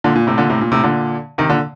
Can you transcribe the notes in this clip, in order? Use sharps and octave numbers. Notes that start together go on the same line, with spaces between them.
A#2 D3
A#2
A2 C3
A#2 D3
A2 C3
A#2
A2 C3
A#2 D3
C3 D#3
A#2 D3